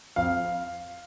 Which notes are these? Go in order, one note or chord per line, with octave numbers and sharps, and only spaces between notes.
F2 F5